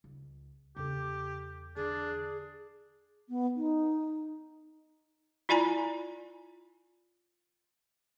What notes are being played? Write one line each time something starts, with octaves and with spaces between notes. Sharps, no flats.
C#2
E2 C#3 D4 G4 A4
D3 E3 D4 G#4
B3
D#4
E4 F4 D5 G#5 A#5 B5